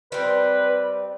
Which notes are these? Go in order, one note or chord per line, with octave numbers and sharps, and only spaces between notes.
G3 C4 B4